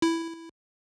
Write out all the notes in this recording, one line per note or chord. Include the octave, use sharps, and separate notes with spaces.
E4